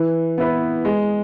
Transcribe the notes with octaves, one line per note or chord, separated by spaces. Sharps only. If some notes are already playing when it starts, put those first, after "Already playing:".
Already playing: E3
B3 E4 B4
G#3